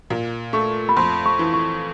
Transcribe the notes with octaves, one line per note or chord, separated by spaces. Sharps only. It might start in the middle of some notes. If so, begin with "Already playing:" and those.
A#2
A3 C#6
B5
F2 C6
C#6
E3
C#6